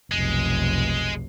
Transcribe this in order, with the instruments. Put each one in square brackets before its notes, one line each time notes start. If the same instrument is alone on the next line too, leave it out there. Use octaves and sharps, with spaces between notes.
[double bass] F1 B1 [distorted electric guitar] G#3